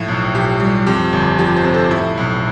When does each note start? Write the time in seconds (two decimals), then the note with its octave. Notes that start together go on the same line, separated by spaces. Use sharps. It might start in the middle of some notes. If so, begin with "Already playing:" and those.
Already playing: A2 F3
0.08 B1
0.34 B1 G4
0.60 G3
0.86 F2 G4
1.13 G1
1.38 F3 G4
1.56 C5
1.64 C3
1.74 A4
1.91 A2 E4
2.17 B1